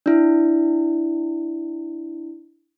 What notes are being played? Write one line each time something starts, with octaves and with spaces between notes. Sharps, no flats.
D4 E4